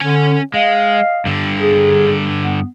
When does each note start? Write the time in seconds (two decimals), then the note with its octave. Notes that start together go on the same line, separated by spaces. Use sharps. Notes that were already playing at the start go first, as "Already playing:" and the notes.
0.01 D3 C#4 G#5
0.54 G#3 D#5 F5
1.26 G2 D3
1.60 G#4
2.39 B3